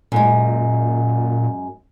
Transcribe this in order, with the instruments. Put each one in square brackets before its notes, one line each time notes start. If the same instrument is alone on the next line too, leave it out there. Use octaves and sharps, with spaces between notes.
[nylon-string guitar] F#2 G#3 [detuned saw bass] A#2